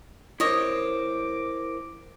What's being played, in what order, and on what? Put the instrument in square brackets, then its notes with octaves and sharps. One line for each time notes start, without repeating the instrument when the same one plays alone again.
[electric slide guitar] E4 A#4 C5 [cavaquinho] C#5 D#5 [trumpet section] D6